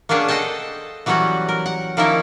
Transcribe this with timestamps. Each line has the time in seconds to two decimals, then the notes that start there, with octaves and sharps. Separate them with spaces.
0.09 A#3 B3 C#4 D4 G#4
0.28 A4 C5 D#5 F#5 G5 A5
1.06 E3 F#3 G3 B3 C#4 F#4
1.49 A#4
1.66 F#5
1.97 D#3 F3 A#3 C#4 E4 A#4